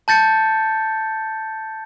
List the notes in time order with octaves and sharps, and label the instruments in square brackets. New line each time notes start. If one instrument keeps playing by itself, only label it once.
[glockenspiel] A5 G6 A6 C#7